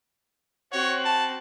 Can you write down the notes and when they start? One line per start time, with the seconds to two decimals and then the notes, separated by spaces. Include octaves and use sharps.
0.72 C4 F#4 C#5
1.05 A5